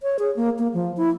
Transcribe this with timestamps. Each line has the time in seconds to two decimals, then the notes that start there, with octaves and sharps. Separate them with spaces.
0.03 C#5
0.19 G#4
0.36 A#3
0.59 A#3
0.74 F3
0.97 E4